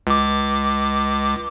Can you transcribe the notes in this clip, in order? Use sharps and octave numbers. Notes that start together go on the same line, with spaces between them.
C#2 D6